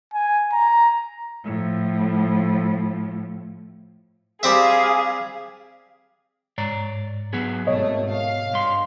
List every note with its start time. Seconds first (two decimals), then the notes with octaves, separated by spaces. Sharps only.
0.13 G#5
0.53 A#5
1.44 A2 F3
4.43 G3 C4 G#4 E5 F5
6.58 G#2 C#5 D5 A#5
7.33 F#3 B3 G#4
7.67 G#1 B2 A3 C#5 D#5
8.12 F5
8.53 G2 C6